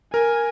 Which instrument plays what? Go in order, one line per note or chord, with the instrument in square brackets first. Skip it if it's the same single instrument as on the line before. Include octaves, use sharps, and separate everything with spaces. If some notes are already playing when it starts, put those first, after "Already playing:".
[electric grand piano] A#4 [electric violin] G#5